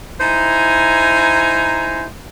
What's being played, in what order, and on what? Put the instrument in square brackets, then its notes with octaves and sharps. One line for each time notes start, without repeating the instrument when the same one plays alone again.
[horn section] D#4 E4 C5 G#5 A#5